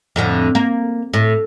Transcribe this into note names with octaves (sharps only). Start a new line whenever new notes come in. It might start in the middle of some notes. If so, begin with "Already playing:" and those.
F2 A2 D3
A#3
A2